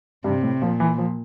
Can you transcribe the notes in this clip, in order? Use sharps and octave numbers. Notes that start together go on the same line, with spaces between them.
G2 C3
A2
A#2 F3
E3
F3